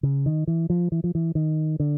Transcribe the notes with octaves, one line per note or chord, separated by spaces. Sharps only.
C#3
D#3
E3
F3
E3
F3
E3
D#3
D3